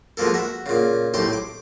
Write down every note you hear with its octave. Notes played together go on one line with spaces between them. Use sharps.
B2 F3 G#3 A#3 A4
F#4 E5
A#2 C#3
B1 A2 G4 C5 C6
D6